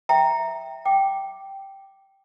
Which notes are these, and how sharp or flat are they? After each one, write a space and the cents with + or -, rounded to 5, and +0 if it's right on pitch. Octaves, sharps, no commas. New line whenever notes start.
E5 +0 G5 +0 A#5 +0
G5 -10 D6 +0